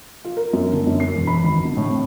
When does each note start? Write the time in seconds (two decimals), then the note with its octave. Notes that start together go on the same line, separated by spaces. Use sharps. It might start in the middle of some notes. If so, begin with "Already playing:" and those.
0.24 F4
0.37 A#4
0.53 F#2
0.73 D3
0.87 F#2
1.00 C7
1.15 E1
1.27 B5
1.44 G#1
1.65 D3
1.77 A2
1.90 C4